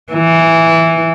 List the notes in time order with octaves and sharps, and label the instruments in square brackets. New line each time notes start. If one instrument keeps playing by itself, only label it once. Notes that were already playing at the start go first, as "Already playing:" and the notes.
[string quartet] E3